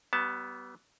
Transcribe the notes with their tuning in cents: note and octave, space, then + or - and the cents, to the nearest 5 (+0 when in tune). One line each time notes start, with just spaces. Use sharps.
G3 -35 B3 +0 A5 +0